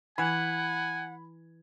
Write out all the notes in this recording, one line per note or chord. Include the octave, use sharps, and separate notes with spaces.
E3 F#5 G#5 B5 G#6